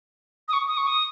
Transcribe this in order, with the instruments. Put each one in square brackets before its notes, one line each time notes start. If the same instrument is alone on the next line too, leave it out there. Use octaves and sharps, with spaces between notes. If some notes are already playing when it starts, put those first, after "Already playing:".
[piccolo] D#6
C#6
D#6
C#6
D#6